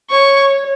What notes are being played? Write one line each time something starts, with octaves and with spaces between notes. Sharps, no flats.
C#5 C#6